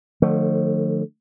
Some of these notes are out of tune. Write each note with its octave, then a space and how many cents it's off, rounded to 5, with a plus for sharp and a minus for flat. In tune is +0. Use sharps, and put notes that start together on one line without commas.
D3 +45 F3 +30 A3 +15